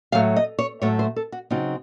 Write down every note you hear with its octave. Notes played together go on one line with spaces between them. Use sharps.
A2 F#3 A3 F5
D#5
C#5
A2 F#3 A3 C#5
C5
A4
F#4
C#3 F#3 C4 D#4 F4